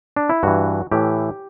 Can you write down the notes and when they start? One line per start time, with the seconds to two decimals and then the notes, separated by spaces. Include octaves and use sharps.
0.17 D4
0.29 E4
0.43 G2 E3 F#4
0.91 A2 E3 G4